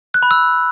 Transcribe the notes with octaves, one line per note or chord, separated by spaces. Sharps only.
F#6
B5
E6